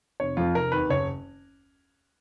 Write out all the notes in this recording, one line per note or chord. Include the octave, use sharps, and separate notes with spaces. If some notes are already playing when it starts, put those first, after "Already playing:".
F1 C#5
F2 F3 F4
F1 A#4
D#2 D#3 B4
F#1 C#5